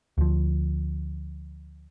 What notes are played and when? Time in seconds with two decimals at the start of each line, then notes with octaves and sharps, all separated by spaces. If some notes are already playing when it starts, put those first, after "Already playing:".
0.18 D2 F3